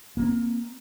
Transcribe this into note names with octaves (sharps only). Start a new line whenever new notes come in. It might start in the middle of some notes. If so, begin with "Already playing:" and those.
A#3 C4